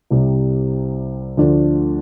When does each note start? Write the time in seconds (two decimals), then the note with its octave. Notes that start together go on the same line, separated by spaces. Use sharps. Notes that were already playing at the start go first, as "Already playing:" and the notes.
0.10 C2 C3 G3
1.37 D2 D3 F3 A3 D4